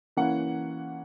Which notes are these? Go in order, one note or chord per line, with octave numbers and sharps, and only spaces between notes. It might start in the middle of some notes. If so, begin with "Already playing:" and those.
E3 A#3 C#4 F#5